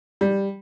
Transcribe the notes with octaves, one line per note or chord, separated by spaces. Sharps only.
G3